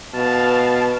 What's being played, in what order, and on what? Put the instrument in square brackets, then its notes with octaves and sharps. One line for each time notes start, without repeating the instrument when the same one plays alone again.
[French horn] B2 [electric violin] F5 A5